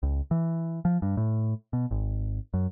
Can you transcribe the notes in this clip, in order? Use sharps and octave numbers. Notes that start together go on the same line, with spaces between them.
C#2
E3
F3
G2
A2
B2
G#1
F#2